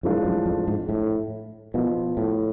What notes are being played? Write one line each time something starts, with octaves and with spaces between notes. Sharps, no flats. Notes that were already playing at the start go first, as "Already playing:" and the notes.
F#2 A2 F3 G#3 D4 F4
F#2
F2
G#2
A2
B2 F3 B3 F4
A2